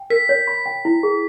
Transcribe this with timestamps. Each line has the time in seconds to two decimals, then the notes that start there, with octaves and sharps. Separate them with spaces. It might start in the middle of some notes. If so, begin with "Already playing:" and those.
Already playing: G5
0.10 A#4 B6
0.29 C#5
0.47 B5
0.66 G5
0.85 E4
1.03 G#4